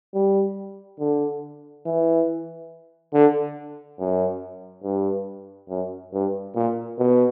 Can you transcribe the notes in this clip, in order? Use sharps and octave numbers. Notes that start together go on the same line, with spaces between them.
G3
D3
E3
D3
F#2
G2
F#2
G2
A#2
B2